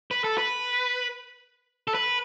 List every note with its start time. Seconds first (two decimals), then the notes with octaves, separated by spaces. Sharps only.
0.11 B4
0.24 A4
0.38 B4
1.88 A4
1.94 B4